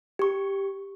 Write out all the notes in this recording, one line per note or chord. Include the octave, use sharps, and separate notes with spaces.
G4 C#6